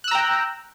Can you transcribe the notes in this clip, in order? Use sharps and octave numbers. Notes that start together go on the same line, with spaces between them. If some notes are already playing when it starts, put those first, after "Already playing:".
G5 A#5 E6 F#6